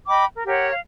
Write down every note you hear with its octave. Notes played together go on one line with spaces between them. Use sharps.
D#5 G5 B5 D6
A#4
G4 A#4 C#5 F#5
F5